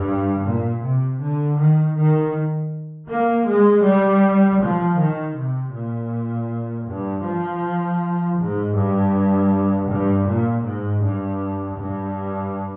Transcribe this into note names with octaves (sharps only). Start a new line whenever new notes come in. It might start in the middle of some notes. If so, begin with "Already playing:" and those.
Already playing: G2
A#2
C3
D3
D#3
D#3
A#3
G#3
G3
F3
D#3
C3
A#2
G2
F3
G#2
G2
G2
A#2
G#2
G2
G2